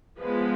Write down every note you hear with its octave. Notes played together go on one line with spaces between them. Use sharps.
F3 G#3 B3 B4